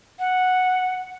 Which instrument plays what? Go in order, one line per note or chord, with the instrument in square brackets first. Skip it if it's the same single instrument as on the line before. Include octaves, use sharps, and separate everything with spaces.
[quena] F#5